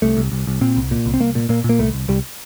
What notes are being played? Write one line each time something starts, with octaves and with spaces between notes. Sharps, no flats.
C2 A3
C2
C2
C2
A#2 C4
C2
A#2
C2
C4
C2 A#3
A#2
A#2 A#3
A#2
A#3
C2 A3
C2
C2 G3